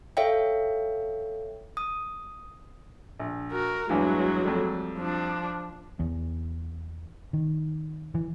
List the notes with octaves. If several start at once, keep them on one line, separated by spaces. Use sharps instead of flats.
A4 C#5 E5 F5 G5
D#6
A#1
F#4 A#4
E2 G2 E3 F#3 G#3
F2 G3 A3
F3 D4
E2
D#3
E3